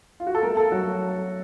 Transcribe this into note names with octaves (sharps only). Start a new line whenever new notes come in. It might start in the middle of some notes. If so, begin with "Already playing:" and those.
F4
F#4
A4
A3 A#4
A4
F#3 F#4